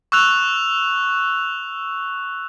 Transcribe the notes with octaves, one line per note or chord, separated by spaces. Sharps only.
C#6 E6 F#6 F7